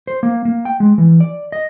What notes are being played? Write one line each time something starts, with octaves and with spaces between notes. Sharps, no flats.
C5
A#3
A#3
G5
G#3
E3
D5
D#5